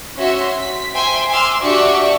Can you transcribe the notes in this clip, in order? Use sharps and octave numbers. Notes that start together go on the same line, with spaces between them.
C#4 F#4 E5 C6
B6
C5 E5 G5 G#5 C6
G#5 C6 D6 E6 F6
D4 F#4 G4 E5 C#6 D6